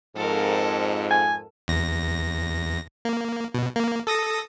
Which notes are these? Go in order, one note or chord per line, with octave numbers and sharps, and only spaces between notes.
F2 G#2 A4 A#4
G#5
E2 A#6
A#3
B2
A#3
A4 D#6 A#6